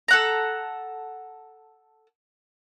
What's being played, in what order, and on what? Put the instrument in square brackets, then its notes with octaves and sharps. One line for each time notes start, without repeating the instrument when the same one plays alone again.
[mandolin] A4 F#5 A#5